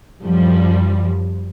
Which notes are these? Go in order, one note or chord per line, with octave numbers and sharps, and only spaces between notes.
F#2 F3 G3